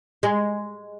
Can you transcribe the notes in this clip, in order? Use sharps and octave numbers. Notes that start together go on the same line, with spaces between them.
G#3